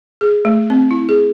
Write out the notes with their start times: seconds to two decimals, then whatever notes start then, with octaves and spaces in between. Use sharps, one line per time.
0.21 G#4
0.45 A3
0.70 C4
0.91 E4
1.09 G#4